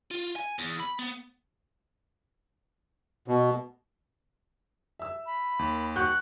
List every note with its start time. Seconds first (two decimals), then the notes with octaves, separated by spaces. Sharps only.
0.11 F4
0.36 G#5
0.59 E2
0.80 B5
0.99 B3
3.28 B2
4.99 E5 E6
5.26 B5
5.59 D#2
5.96 F#4 F#5 C#6 F#6 G6